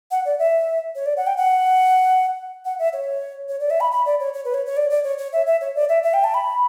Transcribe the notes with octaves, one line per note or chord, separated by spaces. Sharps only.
F#5
D5
E5
C#5
D5
F#5
G5
F#5
F#5
E5
C#5
C#5
D5
E5
B5
B5
D5
C#5
C#5
B4
C#5
C#5
D5
D5
C#5
C#5
E5
E5
C#5
D5
E5
E5
G5
A5
B5